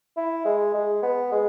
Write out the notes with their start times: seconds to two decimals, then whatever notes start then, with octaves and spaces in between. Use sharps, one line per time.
0.17 E4
0.45 G#3
0.74 G#3
1.03 B3
1.32 G#3